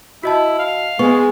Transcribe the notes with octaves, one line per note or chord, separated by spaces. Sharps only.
E4 F#4 D#5 A5
F5
G#3 B3 C#6